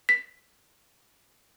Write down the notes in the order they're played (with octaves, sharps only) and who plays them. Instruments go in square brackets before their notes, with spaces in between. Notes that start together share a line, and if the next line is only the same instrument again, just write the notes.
[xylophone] B6